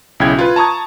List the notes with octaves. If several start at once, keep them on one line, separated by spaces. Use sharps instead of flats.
B1 C#3 E4 G5 G#6
F4 B4
A5 A#5 C#6 D#6 G#6